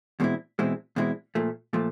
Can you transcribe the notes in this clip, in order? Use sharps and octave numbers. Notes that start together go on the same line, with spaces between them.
E2 B2 G#3 C4 E4
E2 B2 G#3 C4 E4
E2 B2 G#3 C4 E4
A#2 F3 A3
A#2 F3 A3